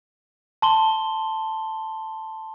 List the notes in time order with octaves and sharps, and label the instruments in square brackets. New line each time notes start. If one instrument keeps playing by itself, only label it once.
[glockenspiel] A5 C6 G7